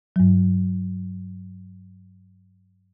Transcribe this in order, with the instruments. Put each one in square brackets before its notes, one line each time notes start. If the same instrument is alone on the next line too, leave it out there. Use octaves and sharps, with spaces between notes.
[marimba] G2 F#3